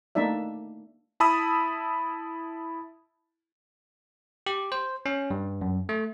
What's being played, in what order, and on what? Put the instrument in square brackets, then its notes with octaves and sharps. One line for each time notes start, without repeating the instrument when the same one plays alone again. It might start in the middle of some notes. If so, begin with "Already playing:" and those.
[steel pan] A3 A#3 D4 D#4 D5 E5
[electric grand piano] E4 A5 B5 D#6 E6
[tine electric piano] G4
C5
C#4
G2
F#2
A3